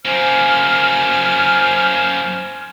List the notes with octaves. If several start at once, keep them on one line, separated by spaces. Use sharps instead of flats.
F#2 A#3 C5 G#5 F6